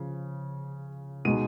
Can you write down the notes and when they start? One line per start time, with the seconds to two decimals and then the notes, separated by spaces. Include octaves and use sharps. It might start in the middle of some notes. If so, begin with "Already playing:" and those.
Already playing: C#3 F3
1.25 B2 G#3 D#4 D#7